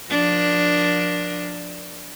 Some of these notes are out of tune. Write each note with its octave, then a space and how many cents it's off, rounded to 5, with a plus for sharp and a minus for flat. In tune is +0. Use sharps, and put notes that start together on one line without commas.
F3 +25 D4 +0 A#4 +25